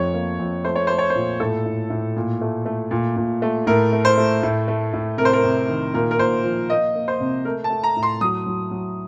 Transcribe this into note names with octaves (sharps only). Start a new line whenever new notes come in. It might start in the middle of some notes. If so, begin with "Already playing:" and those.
Already playing: F2 A3 C#5
A#3
F2
A3 C5
C#5
A3 C5
C#5
C5
A#2
A2 A4
A2
A2
A#2
A3
A3
A#2
A#2
A3
A2 A#4
A3
C5
A3
A2
A3
A2
C3 A#4
C5
A#4
C3
D#3
A#2 A#4
A#4
A#2 C5
F3
A#3 D#5
A#3
C5
C3
A3 A#4
A5
A3
A#5
A2
C6
F#3 D#6
F#3
F#3